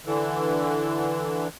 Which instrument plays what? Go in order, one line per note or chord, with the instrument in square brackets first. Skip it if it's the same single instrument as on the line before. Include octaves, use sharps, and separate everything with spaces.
[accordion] D3 E3